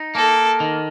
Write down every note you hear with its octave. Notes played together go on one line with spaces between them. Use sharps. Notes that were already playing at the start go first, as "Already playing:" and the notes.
Already playing: D#4
A#3 A4
D#3